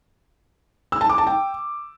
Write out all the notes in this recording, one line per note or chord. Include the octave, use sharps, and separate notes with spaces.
E6
A5
D6
A5
G5